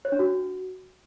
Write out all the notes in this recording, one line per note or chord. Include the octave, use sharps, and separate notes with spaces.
C#5
D4
F#4